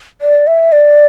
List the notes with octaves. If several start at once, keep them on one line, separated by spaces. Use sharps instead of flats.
D5
E5
D5